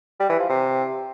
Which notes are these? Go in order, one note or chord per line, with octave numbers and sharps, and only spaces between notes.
G3
E3
F3
C3